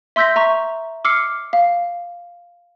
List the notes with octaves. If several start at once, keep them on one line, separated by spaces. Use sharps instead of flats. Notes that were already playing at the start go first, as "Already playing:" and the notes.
E5 C6 E6 G6 A#6 B6
E5 A#5 C#6
D6 E6 F6 C7 C#7
F5